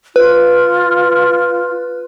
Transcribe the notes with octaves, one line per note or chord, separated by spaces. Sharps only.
F4 B4